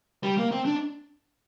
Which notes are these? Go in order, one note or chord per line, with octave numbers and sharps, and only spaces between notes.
G3
A#3
C4
D4